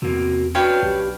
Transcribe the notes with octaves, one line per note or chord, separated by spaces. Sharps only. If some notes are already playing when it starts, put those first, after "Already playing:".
E2 C3 A#3 F#4
C#4 D4 F#4 B4 C#5 F5 G5
B1 G4